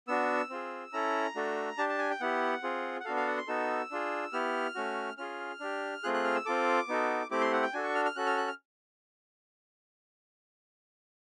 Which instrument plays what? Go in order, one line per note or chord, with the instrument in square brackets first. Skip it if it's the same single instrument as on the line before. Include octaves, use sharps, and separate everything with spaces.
[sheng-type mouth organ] B3 D4 F#4 E6
C4 F4 G#4
C#4 E4 A4 A#5
A3 D4 F#4 A4
D4 G4 A5
A5
G#5
G5
B3 E4 G4 F#5
C4 F4 G#4
F#5
B3 D4 F#4 A4 F5
F5
F#5
C6
B3 D#4 F#4 A4 E6
D4 F4 G#4
B3 E4 G4 F6
A3 C#4 F#4
C#4 F4 G#4 F6
D4 G4
A3 C4 F4 G#4 F#6
F#6
F6
E6
C4 F4 A4 D6
B3 D#4 F#4 A4
A3 C4 E4 G4 D6
C6
F#5
G5
D4 F#4 A4 G#5
C#6
F6
F6
C#4 F#4 A4 F#6
F6
F#6
F6